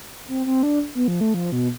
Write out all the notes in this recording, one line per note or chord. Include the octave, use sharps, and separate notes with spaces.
C4
C4
D4
B3
F3
A3
F3
B2